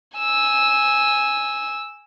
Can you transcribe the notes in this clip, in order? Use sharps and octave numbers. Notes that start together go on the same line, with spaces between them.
G#5 E6